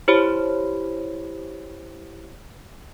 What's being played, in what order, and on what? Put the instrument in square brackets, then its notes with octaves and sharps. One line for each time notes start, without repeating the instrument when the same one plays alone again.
[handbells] E4 G4 C5 C#5 B5